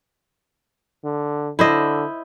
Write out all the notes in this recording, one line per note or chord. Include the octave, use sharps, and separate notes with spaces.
D3
D3 E4 C5 D#5